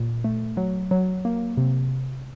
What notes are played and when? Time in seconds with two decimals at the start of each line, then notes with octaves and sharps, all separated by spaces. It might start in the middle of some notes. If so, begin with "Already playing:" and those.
Already playing: A#2
0.24 A3
0.57 F#3
0.91 F#3
1.25 A#3
1.57 C3